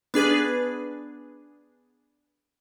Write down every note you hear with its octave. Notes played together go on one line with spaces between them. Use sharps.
B3 D4 G#4 B4